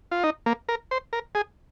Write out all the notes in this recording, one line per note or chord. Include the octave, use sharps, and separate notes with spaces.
F4
D#4
A#3
A#4
C5
A#4
G#4